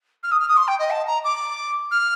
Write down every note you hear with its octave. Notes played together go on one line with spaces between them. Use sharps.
F6
D#6
F6
D#6
C6
G5
D#5
A5
A#5
D6
F6